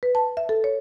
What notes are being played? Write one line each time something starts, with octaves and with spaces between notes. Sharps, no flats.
B4
A5
E5
A4
C#5